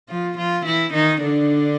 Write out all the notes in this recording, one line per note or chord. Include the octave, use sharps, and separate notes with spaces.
F3 F4
F3 F4
E3 E4
D#3 D#4
D3 D4